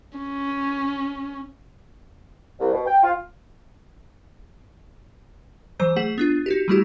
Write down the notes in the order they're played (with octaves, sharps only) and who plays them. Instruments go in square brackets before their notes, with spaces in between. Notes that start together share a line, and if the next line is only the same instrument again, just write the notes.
[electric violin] C#4
[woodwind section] C2
B2
G5
F4
[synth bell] E3 F#3 C5 G6
A3 G#4 F#5 B6 E7 F#7
B3 D4 F4
D#4 F#4 G4
F#3 G3 A3 E4 F#4 G4